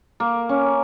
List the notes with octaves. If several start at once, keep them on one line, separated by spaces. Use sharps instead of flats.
A#3
C#4